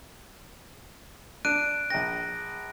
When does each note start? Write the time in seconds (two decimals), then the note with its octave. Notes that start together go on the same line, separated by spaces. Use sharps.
1.45 D4 F#6 D7 D#7
1.90 A#1 G5 A#6